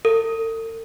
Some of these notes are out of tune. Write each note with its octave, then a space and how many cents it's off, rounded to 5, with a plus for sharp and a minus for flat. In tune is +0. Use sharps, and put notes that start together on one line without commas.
A4 +45